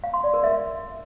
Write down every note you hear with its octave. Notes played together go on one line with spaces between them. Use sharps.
F5
C6
D5
A#4
E5